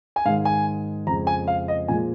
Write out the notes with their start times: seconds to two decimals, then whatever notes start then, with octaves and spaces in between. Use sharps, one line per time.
0.16 G#5
0.25 G#2 D#3 G#3 F5
0.45 G#5
1.07 F2 C#3 G#3 A#5
1.27 G#5
1.48 F5
1.68 D#5
1.88 A#2 F3 G#3 G#5